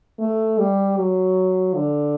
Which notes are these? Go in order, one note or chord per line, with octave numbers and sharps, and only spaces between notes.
A3
G3
F#3
D3